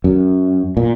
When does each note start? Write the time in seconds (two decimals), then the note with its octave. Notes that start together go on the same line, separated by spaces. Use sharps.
0.04 F#2
0.77 A#2